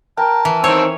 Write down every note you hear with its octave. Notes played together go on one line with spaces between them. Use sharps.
A#4 G5 A5
E3
D#3 C4 C#5 E6